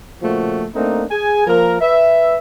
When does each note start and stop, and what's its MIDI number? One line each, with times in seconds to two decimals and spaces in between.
0.22 0.65 46
0.22 0.65 49
0.22 0.65 53
0.22 0.65 57
0.22 0.65 66
0.75 1.05 57
0.75 1.05 58
0.75 1.05 60
0.75 1.05 62
0.75 1.05 63
1.11 1.44 68
1.11 1.44 80
1.47 1.76 53
1.47 1.76 58
1.47 1.76 70
1.81 2.37 71
1.81 2.37 76